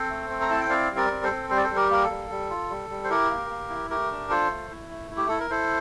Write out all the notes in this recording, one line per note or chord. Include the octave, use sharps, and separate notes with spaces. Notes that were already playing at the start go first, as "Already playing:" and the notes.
Already playing: C4 A4 C5
A3
C4
A#5
E4 A5
G5
C4 D5 F5
G3
A#4 D5
C4
A4 C5
C4
G3 C5
D5
A4 C5
G3
G4 A#4
A#3 A#4
A4
G3
G3
F4
G3
G3
C5
E4 G4 A#4
A#3
A#3
E4
A3 G4 A#4
D4
F4 A4 C5
A3
E4
A3
E4
G4
E4 A4
A#4
E4 A4 C5